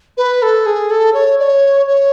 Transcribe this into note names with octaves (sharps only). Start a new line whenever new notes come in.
B4
A4
G#4
A4
C#5
D5
C#5
C#5